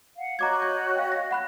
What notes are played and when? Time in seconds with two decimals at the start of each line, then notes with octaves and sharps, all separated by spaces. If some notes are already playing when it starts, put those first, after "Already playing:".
0.16 F5 F#5
0.39 F#4 C#5 D#5 A#5 D6 G#6
0.62 G6
0.96 F5 G5
1.12 A#6
1.31 F#5 B5 F#6